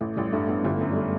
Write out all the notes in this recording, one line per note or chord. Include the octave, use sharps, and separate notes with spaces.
A1 A3
A1 G3
G2 A3
G2 B3
G1 A3
F#2
G3
A3